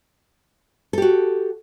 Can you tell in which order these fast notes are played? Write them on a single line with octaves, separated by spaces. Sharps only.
A4 G4 F#4